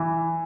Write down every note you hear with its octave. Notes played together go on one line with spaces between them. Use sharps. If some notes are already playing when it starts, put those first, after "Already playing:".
Already playing: E3